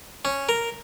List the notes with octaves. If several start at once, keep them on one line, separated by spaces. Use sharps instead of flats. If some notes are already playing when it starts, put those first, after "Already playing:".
C#4
A#4